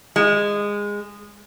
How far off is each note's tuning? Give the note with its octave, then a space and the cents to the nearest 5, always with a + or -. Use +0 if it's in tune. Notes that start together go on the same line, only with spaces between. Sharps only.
G#3 -20